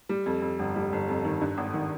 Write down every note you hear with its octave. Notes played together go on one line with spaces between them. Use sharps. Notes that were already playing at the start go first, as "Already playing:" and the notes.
G3
F2
F2
G1
G3
G1
F2
D#3
G2
G#1
D#3